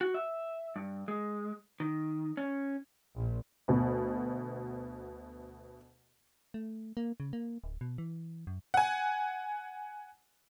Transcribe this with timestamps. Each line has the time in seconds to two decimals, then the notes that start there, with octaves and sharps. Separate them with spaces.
0.01 F#4
0.14 E5
0.76 G2
1.08 G#3
1.80 D#3
2.37 C#4
3.16 A#1
3.68 D2 B2
6.54 A3
6.97 A#3
7.20 C#3
7.33 A#3
7.64 D1
7.81 B2
7.98 E3
8.47 F#2
8.74 F#5 G#5